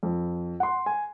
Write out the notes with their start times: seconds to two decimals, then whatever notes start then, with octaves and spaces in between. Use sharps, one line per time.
0.03 F2
0.60 F#5 C6
0.86 G#5